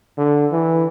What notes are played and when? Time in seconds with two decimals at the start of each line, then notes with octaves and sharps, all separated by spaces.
0.18 D3
0.52 E3